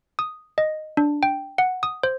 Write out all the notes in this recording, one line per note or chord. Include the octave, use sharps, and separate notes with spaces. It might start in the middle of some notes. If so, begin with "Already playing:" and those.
D#6
D#5
D4
G5
F#5
D#6
C5